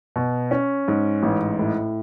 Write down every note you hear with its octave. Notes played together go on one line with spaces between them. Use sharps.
B2
C#4
G#2
A1
A2